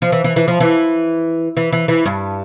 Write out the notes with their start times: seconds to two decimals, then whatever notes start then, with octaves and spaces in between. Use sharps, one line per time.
0.02 F3
0.12 E3
0.24 E3
0.36 E3
0.48 F3
0.60 E3
1.57 E3
1.73 E3
1.88 E3
2.05 G2